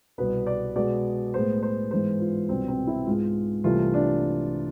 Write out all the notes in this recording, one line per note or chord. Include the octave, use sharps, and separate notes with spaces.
C2 B2 B3 B4
D5
B2 G#3 B3 D5
A2 G#3 B3 C5
C5
G#2 E3 G#3 B3 C5
F4
C2 B2 B3 C4
C4
E4
G#2 G#3 B3 F4
C2 C3 E3 A3 F4
D4